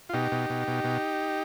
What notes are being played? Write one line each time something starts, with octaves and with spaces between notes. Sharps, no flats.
F4
B2 D#4 G4
B2
B2
B2
B2